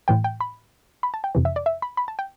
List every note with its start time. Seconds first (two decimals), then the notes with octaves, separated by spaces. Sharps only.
0.08 A2 E3 G5
0.24 G5
0.41 B5
1.03 B5
1.14 A5
1.24 G5
1.35 F2 C3 E3
1.45 E5
1.56 D5
1.66 E5
1.82 B5
1.97 B5
2.08 A5
2.19 G5